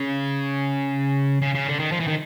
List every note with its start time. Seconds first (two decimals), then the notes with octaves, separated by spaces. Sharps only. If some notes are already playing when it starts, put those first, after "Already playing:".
Already playing: C#3
1.42 C#3
1.55 C#3
1.67 D3
1.79 D#3
1.92 F3
2.00 E3
2.08 D#3